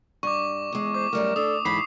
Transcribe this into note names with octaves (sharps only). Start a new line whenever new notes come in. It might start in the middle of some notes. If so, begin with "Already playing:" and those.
G2 C#6 D6
E2 G#3
C5 D6
F#2 G3 A3 A#4
D4 A4 D#6
G#2 D3 E3 B5 C7